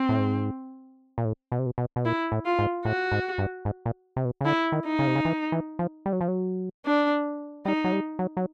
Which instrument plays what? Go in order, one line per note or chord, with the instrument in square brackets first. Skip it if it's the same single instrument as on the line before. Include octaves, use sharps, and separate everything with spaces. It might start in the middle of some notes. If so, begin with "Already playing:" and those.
Already playing: [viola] C4
[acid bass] A2
G#2
A#2
A2
B2
C3
B2
B2
B2
[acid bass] A#2 [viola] E4
[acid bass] A2
[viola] F4
[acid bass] G#2
[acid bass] A2 [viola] F#4
[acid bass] G#2
G2
G#2
A#2
C3
B2
C#3
[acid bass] D3 [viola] E4
[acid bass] D#3
[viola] D#4
[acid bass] C#3
C3
C#3
E3
E3
F3
G3
F#3
F3
F#3
[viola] D4
[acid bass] G3 [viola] D#4
[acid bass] F#3
G3
F#3
F#3